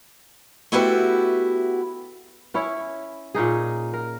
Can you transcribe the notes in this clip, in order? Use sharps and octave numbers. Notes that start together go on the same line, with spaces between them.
A3 B3 E4 F#4 G4 B4
C#4 E4 C#5
A#2 C#4 D#4 G#4
A#4